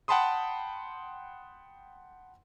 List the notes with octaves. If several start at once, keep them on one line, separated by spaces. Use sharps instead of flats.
F#5 G5 A5 B5 C6 D#6